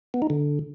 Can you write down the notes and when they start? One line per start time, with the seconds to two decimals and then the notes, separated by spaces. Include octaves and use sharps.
0.14 B3
0.22 D#4
0.30 D3